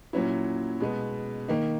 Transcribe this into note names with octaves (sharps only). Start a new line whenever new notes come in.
A#2 F#3 C#4 E4
B2 G#3 B3
D#3 A#3 D#4